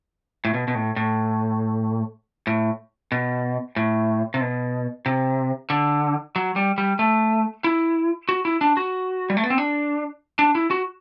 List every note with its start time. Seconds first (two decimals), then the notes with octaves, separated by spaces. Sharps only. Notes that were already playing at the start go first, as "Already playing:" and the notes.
0.45 A2
0.54 B2
0.68 B2
0.75 A2
0.96 A2
2.47 A2
3.12 B2
3.76 A2
4.34 C3
4.41 B2
5.06 C3
5.70 D3
6.36 F#3
6.56 G3
6.78 G3
6.99 A3
7.64 E4
8.29 F#4
8.45 E4
8.61 D4
8.77 F#4
9.30 G3
9.37 A3
9.44 B3
9.50 C4
9.58 D4
10.39 D4
10.55 E4
10.71 F#4